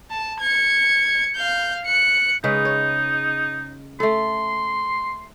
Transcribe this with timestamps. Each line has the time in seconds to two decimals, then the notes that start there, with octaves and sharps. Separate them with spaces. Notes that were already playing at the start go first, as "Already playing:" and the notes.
0.11 A5
0.40 G#6 C#7
1.35 F5 G6
1.85 F#6 C#7
2.44 C#3 G#3 D#4 B4
2.65 C#5
4.00 A3 A4 C6